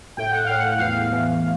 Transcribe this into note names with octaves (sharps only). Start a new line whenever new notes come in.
A2 G5
F#5
A2 F5
F#5
E2 F5
E3